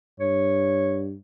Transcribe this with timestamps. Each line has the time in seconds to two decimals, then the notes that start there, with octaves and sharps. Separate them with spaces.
0.20 G2 C#5